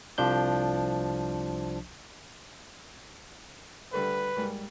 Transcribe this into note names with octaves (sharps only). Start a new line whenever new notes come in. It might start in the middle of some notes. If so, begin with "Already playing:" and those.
C2 F3 D4 G6
D3 G3 A3 B4
G#2 G3 A#3